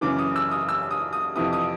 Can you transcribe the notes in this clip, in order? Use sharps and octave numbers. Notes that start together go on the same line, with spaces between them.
F#2 C#3 E3 D6
D#6
E6
D#6
E6
D#6
D#6
F2 C3 E3 D#6
D#6